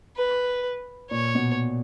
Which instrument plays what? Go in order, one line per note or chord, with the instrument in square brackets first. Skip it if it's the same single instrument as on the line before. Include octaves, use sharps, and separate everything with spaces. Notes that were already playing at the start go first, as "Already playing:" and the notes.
[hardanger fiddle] B4
[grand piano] A#2 [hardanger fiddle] C#5
[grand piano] B2